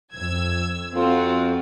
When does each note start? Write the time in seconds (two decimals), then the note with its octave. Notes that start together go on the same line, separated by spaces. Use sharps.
0.13 F2 E6 G#6
0.95 F2 C4 F4 F#4